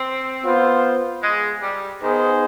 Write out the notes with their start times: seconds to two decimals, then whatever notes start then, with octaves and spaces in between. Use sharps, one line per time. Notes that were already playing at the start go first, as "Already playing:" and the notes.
Already playing: C4
0.43 B3 F4 C5
1.23 G#3
1.62 G3
2.02 D#3 B3 D#4 G#4 C5